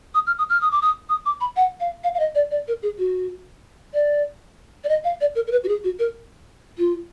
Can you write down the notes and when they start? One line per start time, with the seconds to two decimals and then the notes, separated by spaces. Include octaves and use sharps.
0.14 D#6
0.27 F6
0.39 D#6
0.50 F6
0.61 D#6
0.71 D6
0.82 D#6
1.09 D#6
1.26 D6
1.41 B5
1.56 F#5
1.80 F5
2.04 F5
2.14 F5
2.20 D#5
2.35 D5
2.51 D5
2.68 A#4
2.82 G#4
2.98 F#4
3.94 D5
4.84 D5
4.89 D#5
5.04 F5
5.21 D5
5.35 A#4
5.47 A#4
5.52 B4
5.64 F#4
5.68 G#4
5.84 F#4
5.99 A#4
6.78 F4